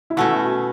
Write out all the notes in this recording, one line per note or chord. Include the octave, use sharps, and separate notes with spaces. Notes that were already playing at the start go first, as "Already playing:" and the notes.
E4
B2 A3 C#4 F#4